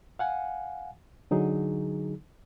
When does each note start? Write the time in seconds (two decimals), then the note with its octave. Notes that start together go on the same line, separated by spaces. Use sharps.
0.19 F5 F#5 G#5
1.31 D3 F#3 D#4 G#4